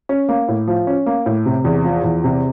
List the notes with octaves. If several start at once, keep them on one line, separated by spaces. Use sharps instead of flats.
C#4
A#3
A2
F3
C#4
A#3
A2
C3
E2
F3
E2
C3